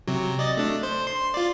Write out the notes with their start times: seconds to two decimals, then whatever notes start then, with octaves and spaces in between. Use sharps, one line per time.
0.07 C3 F#3
0.39 D5 D#5 A6
0.57 A3 D4
0.83 C5
1.07 C6
1.34 F4 D5